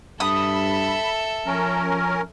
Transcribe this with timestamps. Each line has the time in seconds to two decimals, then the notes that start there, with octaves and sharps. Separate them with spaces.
0.20 G2 A4 E5 B5 D#6
1.46 F3 C#4 A#4